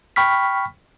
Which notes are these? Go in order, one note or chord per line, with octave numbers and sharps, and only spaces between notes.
G5 B5 C#6 F6 B6